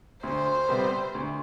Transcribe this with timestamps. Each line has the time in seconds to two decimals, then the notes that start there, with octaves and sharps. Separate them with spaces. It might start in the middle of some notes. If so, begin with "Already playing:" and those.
0.23 D2 C5
0.68 C3 G3 B3
1.15 D2